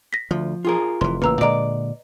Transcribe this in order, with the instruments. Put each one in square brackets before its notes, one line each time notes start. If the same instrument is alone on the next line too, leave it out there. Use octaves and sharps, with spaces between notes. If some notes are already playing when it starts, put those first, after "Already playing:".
[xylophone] A#6 B6
[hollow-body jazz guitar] D2 [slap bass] F3
[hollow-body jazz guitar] F4 G#4 A#4
[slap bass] F1 E3 [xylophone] C6
[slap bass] A1 C#3 A#3 [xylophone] B4 A#5 E6
[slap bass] A#2 D3 G#3 [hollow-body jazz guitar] D5 [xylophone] D#5 A#5